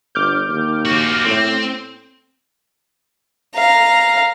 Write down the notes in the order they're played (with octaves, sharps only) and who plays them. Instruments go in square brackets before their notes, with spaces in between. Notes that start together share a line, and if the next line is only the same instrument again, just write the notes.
[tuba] G1 [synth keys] D6 F6 G6
[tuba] D#2
[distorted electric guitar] A#3 F#4
[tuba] A2 [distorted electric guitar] C4
[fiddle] F5 A#5